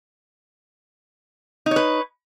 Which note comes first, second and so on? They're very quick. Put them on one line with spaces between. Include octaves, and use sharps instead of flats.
D#4 C#5 B4